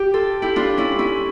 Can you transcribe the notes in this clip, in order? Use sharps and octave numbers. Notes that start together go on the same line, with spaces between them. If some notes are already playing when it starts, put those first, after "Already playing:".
Already playing: G4
F4 A4
E4 G4
D4 F4
C#4 E4
C#4 E4